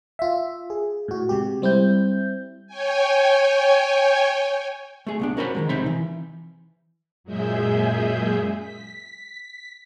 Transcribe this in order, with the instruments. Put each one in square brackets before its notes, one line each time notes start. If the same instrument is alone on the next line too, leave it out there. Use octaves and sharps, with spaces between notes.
[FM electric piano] F4 E5
G#4
A2 F#4
C3 G#3 G4
G3 C4 E4 G6
[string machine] C#5 G5 G#5
[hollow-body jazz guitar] A3 G#4
C2 B3 D4
C#4 F#4 A#4 C5 E5 B5
D#3 F3 G#3
C3 C4 D#4 C5 B5
E3
[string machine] F#2 A#2 G#3 G#4 E5 G6
B6